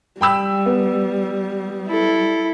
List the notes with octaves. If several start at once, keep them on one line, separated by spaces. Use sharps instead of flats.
G3 G5 B5 E6
B3
E4 A4